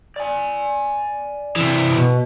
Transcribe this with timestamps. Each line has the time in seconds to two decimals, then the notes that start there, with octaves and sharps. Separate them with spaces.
0.16 D5 G#5
1.56 C3 E3
1.93 B2